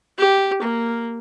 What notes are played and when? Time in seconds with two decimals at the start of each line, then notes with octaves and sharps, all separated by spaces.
0.18 G4
0.62 A#3